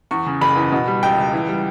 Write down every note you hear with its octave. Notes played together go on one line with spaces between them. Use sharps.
E2 C#6
C#3
F#1 B5
E3
B2
G3
C#2 G5
C#2
E3
G3